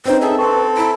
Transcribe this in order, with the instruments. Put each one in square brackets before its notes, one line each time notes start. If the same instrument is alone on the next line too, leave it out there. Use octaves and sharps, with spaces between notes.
[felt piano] C4 C#4 D#4 [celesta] B4 D#5 A#5 [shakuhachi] C5
[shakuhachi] G#4 [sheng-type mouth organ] A4 E5
[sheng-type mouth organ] C4 A4 [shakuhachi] B4 [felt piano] A5 C6 [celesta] C#6
[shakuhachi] E4 [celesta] A#5 [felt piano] D7